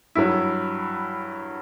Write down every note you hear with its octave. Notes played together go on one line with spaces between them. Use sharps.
G2 F#3 E4